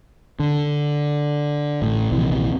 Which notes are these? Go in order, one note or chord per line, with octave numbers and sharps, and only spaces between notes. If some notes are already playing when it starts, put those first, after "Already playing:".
D3
A1 A2
A#1 D#2 C3 E3